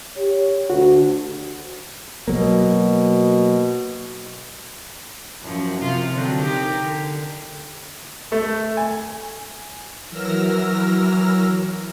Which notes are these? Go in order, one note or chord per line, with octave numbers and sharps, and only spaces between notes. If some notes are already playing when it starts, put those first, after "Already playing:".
G4 C#5
D2 F#4
B2 F#3 A#3
F#2 F3
C3 F3 F4
D3 F#3 C4
D#4 G4 A#4
D3
A3
G#5
E3 F#3 A#4 E6 F6 A#6